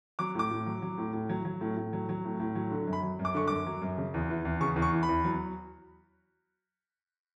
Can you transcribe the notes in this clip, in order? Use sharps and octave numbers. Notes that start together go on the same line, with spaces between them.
F#3 D6
A2 D6
A2
F#3
F#3
A2
A2
F#3
F#3
A2
A2
F#3
F#3
A2
A2
F#3
D3
F#2
B5
F#3
F#2
D6
D3 C#6
F#2 D6
F#3
F#2
C#3
E2
E3
E2
C#3 C#6
E2
C#6
E3
B5
E2
F#3